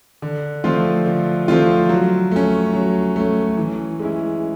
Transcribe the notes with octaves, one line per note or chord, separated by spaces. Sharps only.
D3
F3 A3 C4 F4
D3
F3 A3 C4 F4
F#3
A3 C#4
F#3
A3 C#4
E3
G#3 C#4 E4